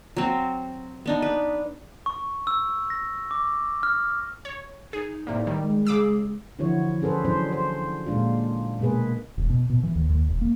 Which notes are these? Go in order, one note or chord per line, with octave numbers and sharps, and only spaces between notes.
F#3 C4
B3 D4 D#4
B4
C#6
E6
A#6
D6
F6
C#5
D#4 G#4
A2 C3 A#3 D5
D#3 G3
G#3
C#3 G#4 D6 E6
D3 E3 F3 E4 F#4 C#5
C#4 G#4 A4 B4 C5
E3 F#3 C#4 D4 C5
C5
A#2 G#3 D4 F4
B2 G#3 A#3 G#4 B4
E1
B2
B2
E3
D#2
D#2
E1
A#3